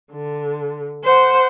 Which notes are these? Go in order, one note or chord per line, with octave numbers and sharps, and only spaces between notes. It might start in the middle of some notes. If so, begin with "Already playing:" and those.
D3
C5 F#5